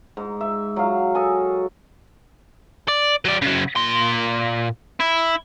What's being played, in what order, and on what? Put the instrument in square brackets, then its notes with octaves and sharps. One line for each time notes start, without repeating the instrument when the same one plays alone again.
[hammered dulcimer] G#2
E5
F#3 F5
A4 D#5 G#5
[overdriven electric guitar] D5
F#3 D5
C#3 F#3
A#2 C6
E4